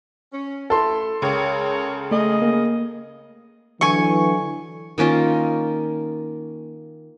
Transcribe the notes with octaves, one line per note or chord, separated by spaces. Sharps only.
C#4
A3 E4 A4 C6
C#2 C#3 A#4 C#5
A3 G#4 D#5
A#3
D3 E3 F#3 G#5 C#6
D#3 A#3 C#4 F4